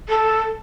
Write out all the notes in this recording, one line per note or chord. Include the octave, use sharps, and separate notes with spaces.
A4